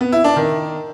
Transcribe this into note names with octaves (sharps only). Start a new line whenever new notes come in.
B3
E4
D4
D#3